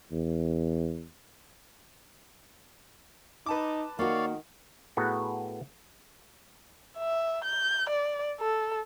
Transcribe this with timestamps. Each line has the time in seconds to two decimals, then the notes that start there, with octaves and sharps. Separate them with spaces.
0.12 E2
3.46 D#4 B4 A5 D6
3.99 D#3 A#3 F#4 C#5 D5 F5
4.97 A2 B3 F#4 G#4 B4 A#5
6.98 E5
7.44 G6
7.90 D5
8.40 A4